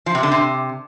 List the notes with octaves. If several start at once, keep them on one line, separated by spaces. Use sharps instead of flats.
F3
C3
D3
C3